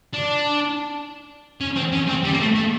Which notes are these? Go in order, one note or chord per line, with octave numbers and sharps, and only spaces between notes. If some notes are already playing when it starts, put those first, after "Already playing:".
D4
C#4
C4
C#4
C4
G3
A#3
A3
A3